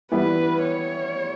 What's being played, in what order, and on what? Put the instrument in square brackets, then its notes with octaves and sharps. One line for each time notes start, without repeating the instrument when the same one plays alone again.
[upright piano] E3 G3 B3 E4 [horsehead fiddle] B4
[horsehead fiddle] C#5